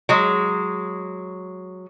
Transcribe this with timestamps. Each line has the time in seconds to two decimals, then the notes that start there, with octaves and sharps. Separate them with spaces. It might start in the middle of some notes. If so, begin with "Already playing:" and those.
0.09 F#3 G#3